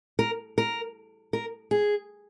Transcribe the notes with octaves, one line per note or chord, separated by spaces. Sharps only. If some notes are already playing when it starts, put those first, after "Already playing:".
A#4
A#4
A#4
G#4